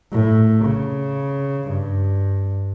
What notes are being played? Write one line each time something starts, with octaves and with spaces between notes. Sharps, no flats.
A2
C#3
G2